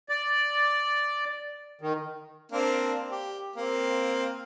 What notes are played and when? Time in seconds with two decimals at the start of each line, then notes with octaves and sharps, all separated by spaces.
0.09 D5
1.81 D#3
2.52 A#3 C4 D4
3.11 G4
3.56 A#3 C4